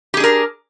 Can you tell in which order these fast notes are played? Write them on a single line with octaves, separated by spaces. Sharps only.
G4 G#4 D4 A#4